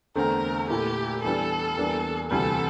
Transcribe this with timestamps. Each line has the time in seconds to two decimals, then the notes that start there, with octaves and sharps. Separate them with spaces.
0.15 E2 D3 A3 C4 A#4
0.69 A#2 A3 E4 G4
1.23 E2 E3 G3 D4 A4
1.77 E2 E3 G3 A#3 D4
2.31 D2 C3 E3 G3 A4